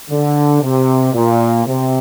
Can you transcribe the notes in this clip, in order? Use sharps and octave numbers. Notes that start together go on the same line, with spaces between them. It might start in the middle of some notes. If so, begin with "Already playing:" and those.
D3
C3
A#2
C3